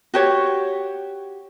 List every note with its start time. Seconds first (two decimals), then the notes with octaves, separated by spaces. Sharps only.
0.14 F#4 G4 C#5